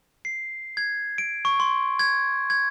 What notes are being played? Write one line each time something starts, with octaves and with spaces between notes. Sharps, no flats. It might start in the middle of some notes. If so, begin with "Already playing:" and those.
C7
G#6
D7
C#6
C6
G#6
G#6